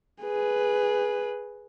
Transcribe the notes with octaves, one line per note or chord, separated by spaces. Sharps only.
G#4 B4